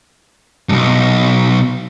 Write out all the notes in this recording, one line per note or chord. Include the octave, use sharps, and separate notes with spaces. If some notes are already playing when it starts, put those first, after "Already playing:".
B1 G2